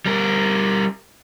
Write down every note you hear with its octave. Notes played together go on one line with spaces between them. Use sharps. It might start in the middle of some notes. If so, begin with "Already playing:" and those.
G3 A#4